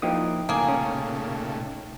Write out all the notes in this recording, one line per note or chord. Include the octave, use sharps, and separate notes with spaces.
F3 A#3 D#4 E4 G5 D#6
A#2 C#3 A3 A#3 G#4 G#5
C#4